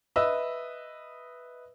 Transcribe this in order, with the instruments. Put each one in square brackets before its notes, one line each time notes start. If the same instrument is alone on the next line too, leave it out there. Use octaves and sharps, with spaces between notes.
[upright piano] B4 D#5 E5 E6